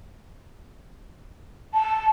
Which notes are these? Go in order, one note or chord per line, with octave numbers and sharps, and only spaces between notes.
A5